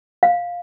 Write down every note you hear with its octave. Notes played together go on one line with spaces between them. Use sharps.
F5